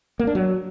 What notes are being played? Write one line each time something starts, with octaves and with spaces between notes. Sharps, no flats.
A#3
D4
F#3